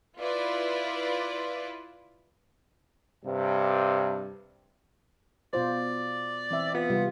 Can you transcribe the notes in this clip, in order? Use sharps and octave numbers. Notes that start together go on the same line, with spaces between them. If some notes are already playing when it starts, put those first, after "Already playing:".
E4 F4 B4 D5
G2 C3
B2 F4 C5 D5
E3 C4 E5
B3 F4
C3 G3 F4